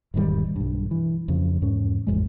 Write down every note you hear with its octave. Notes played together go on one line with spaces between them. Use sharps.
E1 G#2 D#3 G3
B1 G2
E3
F2 C#3
E2 G#2 C#4
A1 F2 A#2 G#3